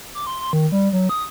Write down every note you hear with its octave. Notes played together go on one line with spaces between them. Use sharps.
D6
C6
C6
D#3
G3
F#3
D#6